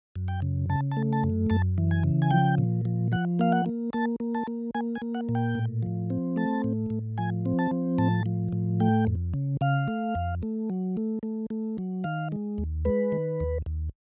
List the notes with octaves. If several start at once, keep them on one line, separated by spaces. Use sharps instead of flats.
F#2
G5
C#3
C#3 A5
A5
A3
A5
F#2
F#2 A5
E3
G#5
C#3
G#5
F3 G5
A#2
F3
F3 F#5
A#3 F5
F#5
A#3
A#3 A5
A#3
A5
A#3
A#3 G#5
G#5
A#3
F#5
A#2
G5
A2
F3
C4
A3 A5
A2
A2
F3 G#5
C4
A5
F3
A2 A5
F3
A2
A3 G5
F2
C#3
C#3 F5
A3
F2
A3
F#3
A3
A3
A3
F#3
D#3 F5
G#3
D#2
G#3 B4
D#3
D#2
D#2